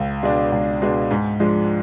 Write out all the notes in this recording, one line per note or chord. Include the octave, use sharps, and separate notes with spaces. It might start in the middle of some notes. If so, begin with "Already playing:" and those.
Already playing: C#2
B2 G#3 D4
C#2
B2 G#3 D4
G#2
F3 G#3 D4